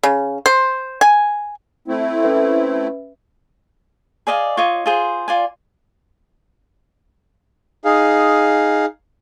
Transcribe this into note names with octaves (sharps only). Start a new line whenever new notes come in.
C#3
C5
G#5
A3 C4 E4
C#4 B4 E5
G#4 D5 D#5 F5
F4 C#5 D#5 D6
F4 G#4 C5
F4 D5 G#5
D#4 G#4 F5